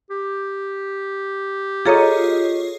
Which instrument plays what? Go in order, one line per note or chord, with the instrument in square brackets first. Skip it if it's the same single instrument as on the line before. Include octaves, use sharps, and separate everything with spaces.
[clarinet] G4
[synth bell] F4 C#5 D#5 [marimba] G#4 A4 A#5